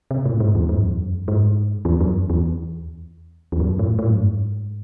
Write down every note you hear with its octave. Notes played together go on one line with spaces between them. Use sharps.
C3
A2
G#2
E2
G#2
F#2
E2
F#2
G#2
E2
F#2
E2
E2
F#2
A2
A2
F#2
G#2